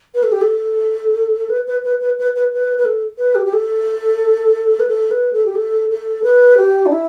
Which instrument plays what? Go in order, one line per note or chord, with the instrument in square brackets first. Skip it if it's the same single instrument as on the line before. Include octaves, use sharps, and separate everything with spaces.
[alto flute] B4
A4
G4
A4
B4
B4
B4
B4
B4
B4
B4
B4
A4
B4
G4
G4
A4
B4
A4
B4
A4
G4
A4
A4
B4
G4
D4
E4